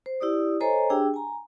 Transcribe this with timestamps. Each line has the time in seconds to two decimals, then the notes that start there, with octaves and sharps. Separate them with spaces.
0.06 C5
0.21 E4 G4 D5 D#6
0.61 A4 C5 C#5 D#5 G#5 A#5
0.90 D4 G4 G#4 G5 E6
1.14 G#5 A#5